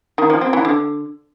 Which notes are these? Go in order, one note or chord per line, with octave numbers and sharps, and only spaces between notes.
D#3
F3
C4
E3
D3